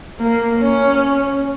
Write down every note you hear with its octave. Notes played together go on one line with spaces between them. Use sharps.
A#3
C#4